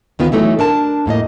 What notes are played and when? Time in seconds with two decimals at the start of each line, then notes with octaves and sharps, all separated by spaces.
0.19 D2 D#3 B3 F4
0.32 E3 F#3 A3 D#4
0.59 D4 A#4 A5
1.06 F2 A2 A#3 D#5